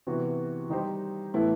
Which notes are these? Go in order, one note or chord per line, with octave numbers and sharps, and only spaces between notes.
C3 E3 B3 F#4
D#3 G3 D#4 G4 C5
A2 E3 B3 E4 A4